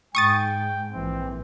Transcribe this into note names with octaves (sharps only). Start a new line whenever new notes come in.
G#2 G5 C#6 D#6 A6
A#1 E3 C4